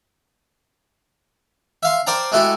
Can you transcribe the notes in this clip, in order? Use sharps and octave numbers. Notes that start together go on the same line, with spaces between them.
E5 F5 C6
A#4 C5 D5 G5 A5 A#5
G#3 A3 E4 F#4 G4 A4